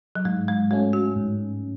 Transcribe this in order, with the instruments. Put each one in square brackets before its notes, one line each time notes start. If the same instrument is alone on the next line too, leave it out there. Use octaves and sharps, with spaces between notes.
[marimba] F#3
[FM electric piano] G#2 [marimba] G#3
[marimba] G#3
[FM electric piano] F#3 A3 C#4 [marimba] G#3
[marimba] F#4
[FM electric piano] G#2